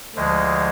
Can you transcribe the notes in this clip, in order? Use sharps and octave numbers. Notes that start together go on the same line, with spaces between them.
D2 D3 F3 G#3